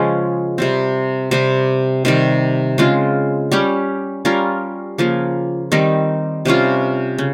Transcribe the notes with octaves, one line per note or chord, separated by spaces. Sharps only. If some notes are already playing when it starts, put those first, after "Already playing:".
Already playing: C#3 F3 G#3 C#4
C3 G3 C4
C3 G3 C4 G4
C3 D#3 G3
C#3 G#3 C4 F4
G3 C#4 G4
G3 C#4 F4 A#4
C#3 F3 A#3
D#3 G3 C4 D#4
C3 G3 C#4 F4
C#3